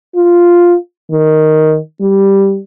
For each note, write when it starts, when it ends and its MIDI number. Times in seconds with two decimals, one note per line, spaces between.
0.15 0.76 65
1.11 1.78 51
2.01 2.60 55